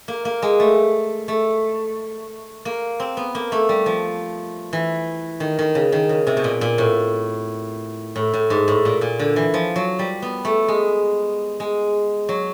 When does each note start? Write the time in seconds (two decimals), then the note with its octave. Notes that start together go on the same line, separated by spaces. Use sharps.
0.08 A#3
0.25 A#3
0.42 G#3
0.60 A3
1.28 A3
2.65 A#3
3.00 C4
3.17 B3
3.35 A#3
3.52 A3
3.69 G3
3.86 F3
4.73 E3
5.40 D#3
5.59 D#3
5.75 C#3
5.92 D#3
6.09 C#3
6.27 C3
6.37 B2
6.44 A#2
6.61 A#2
6.78 A2
8.16 A2
8.34 A2
8.50 G#2
8.68 A2
8.85 A#2
9.01 A#2
9.19 D3
9.36 E3
9.54 F3
9.76 F#3
9.99 G3
10.22 B3
10.45 A3
10.68 G#3
11.60 G#3
12.29 F#3